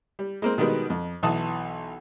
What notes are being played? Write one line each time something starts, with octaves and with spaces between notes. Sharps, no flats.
G3
G#3 A#3 C4
B2 D#3 G3 G#3 B3
F2
B1 E3 A5 D#6